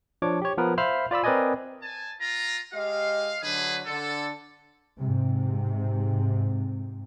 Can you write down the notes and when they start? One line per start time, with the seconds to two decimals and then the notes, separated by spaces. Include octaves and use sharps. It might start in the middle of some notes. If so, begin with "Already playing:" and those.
0.22 F3 D4 C#5 D6
0.42 G4 C#5
0.57 F3 B3 A#4 B4
0.78 C5 E5 F5 B5 F6
1.11 F4 D5 B5 E6
1.24 C4 A#4 B4 D5 D#5 G#5
1.83 G#5 A5
2.19 F4 A#5
2.73 G#3 G4 D#5 F5
3.42 D3 F#3 G#4 B4
3.86 D3 A4
4.97 G#2 C3